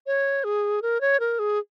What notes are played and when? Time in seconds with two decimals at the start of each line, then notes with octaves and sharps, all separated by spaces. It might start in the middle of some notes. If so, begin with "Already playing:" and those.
0.07 C#5
0.44 G#4
0.82 A#4
1.01 C#5
1.20 A#4
1.39 G#4